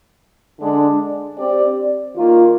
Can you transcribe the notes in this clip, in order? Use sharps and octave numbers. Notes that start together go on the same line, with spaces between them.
D3 G#3 D4
C4 G4 D5
D#3 A#3 F4